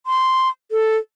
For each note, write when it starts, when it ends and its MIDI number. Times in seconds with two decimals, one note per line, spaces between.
0.07 0.49 84
0.72 0.97 69